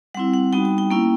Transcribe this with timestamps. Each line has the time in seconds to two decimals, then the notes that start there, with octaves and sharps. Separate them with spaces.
0.14 G3 C4 E4 F#5
0.34 F#5
0.53 G3 B3 D#4 F#4 G5
0.65 G5
0.78 G5
0.91 A#3 C#4 E4 G5